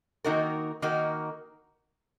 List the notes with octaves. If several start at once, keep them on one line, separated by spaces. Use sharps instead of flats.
D#3 A#3 D#4 F#4 A#4
D#3 A#3 D#4 F#4 A#4